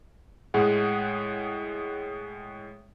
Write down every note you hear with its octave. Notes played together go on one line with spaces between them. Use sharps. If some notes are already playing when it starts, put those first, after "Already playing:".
A2 G#3 G#4 F#5